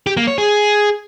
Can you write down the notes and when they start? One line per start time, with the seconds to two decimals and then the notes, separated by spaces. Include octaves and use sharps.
0.07 G4
0.17 A#3
0.28 C#5
0.38 G#4